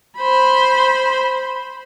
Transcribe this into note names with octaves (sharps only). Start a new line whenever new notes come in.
C5 B5